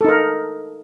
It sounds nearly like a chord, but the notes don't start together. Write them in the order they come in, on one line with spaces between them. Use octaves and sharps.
A4 D#4 A#4